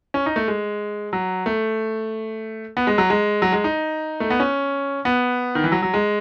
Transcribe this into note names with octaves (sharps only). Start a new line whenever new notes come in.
C#4
D#4
A3
G#3
F#3
A3
B3
G#3
F#3
G#3
F#3
G#3
D#4
A3
B3
C#4
B3
D#3
E3
F#3
F#3
G#3